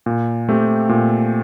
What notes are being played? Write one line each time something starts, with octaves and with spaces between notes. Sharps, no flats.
A#2
A3 C4 G4
A#2